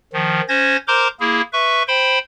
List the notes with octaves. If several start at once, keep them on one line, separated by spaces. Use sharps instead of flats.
D#3 F3
C#4 C5 G#6 A#6
A#4 C5 A#5 C6 D6 G6
A#3 E4 G#4
B4 E5 C#6
C5 G5 B5 C6